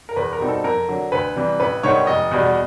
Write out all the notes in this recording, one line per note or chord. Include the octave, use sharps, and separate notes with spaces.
A#4
E2 B4
A#4
B2 G3 C4 D#4
A4
F2 A#4
D3 F#3
D2 B4
C3 E3 G3
A1 B4
G#2 D#3 G3 B3 C#5
F1 D#5
E2 B2 G3